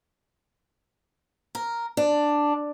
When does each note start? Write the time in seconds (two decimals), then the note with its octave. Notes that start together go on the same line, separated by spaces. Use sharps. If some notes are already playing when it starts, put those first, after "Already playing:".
1.55 A#4
1.97 D4